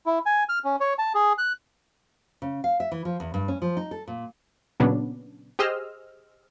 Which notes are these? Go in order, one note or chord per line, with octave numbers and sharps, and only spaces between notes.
E4
G#5
F6
C#4
C#5
A5
G#4
F#6
C#3
F5
E5
E3
F3
E2
G2
C#4
F3
D#4
A4
A#2
A#2 C#3 F#3 B3 C#4 D4
G4 G#4 C5 D#5 E6 F6